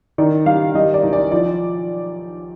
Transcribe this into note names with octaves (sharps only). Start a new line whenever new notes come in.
D#3 D5
G3 F5
G3 D#5
D5
B1
D5
F3 D5